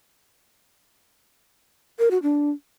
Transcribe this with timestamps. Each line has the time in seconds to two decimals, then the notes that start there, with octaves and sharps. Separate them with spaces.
1.99 A#4
2.11 F#4
2.23 D4